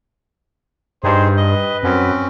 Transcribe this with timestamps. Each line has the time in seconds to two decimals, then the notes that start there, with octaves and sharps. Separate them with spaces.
1.04 G2 D#4 G#4 C5
1.37 B4 D#5
1.83 F#2 C4 C#4